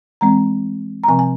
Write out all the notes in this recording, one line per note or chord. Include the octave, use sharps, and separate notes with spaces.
E3 G#3 C4 A#5
A#5
C3 F3 C4 G#5
G#5